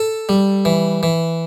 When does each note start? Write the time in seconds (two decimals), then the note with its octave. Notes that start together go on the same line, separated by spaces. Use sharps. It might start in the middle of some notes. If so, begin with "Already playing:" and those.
Already playing: A4
0.29 G3
0.65 E3
1.03 E3